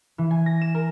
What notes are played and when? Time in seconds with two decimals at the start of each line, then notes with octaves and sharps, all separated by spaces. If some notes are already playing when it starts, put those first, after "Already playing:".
0.18 E3
0.31 G#5
0.46 A#6
0.61 E7
0.75 A#4